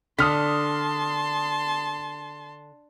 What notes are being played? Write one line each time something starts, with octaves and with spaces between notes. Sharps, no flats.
D3 A5 C6 D#6 F6 B6